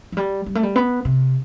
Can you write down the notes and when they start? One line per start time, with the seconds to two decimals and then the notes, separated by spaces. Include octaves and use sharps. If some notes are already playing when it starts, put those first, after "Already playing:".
0.12 F3
0.17 G3
0.46 G3
0.55 A3
0.63 G3
0.76 B3
1.05 C3